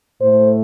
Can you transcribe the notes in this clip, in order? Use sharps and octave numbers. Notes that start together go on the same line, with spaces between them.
A2 A3 C5